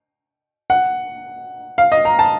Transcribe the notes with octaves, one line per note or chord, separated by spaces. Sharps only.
F#5
F5
D#5
A#5
A5